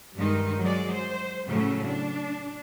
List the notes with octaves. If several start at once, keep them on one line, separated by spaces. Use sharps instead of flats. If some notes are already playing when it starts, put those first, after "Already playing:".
G2 D#3 G#3 D#4
F#3 G#3 G#4 D5
C5
A2 C#3 F#3 A3 C#4
D4